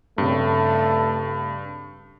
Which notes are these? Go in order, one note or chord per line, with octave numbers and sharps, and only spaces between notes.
G2 C#3 A3 C4